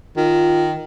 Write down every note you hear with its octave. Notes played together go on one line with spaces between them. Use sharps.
D#3 F4